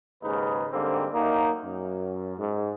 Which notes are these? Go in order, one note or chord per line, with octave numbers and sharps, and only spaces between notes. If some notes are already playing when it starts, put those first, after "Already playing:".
D#2 G#2 C#3 D#4 B4
G#2 D3 G3 A#3 C4
F#2 A#3 D#4
F#2
G#2